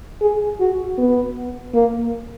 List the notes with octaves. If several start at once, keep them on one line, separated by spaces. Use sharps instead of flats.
G#4
F#4
B3
A#3